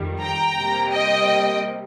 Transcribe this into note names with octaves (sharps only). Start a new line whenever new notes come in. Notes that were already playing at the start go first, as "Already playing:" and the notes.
Already playing: F2 D#3 G3
G5 A#5
C3 G3 A#3
D#5 G5